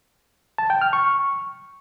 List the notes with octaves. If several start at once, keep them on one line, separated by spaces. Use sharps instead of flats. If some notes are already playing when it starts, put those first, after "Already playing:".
A5
G5
F6
C#6